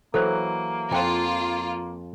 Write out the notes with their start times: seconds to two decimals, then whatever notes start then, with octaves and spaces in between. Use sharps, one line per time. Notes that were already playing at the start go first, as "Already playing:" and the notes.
0.14 E3 F#3 A#3 A4 C5
0.92 F2 E4 F4 F#5 G5 A#5